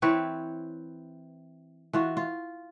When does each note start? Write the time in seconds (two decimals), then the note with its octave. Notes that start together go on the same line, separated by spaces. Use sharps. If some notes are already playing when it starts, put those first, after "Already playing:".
0.02 E3 C4 B4 C#5
1.93 E3 F4 F#4
2.17 F4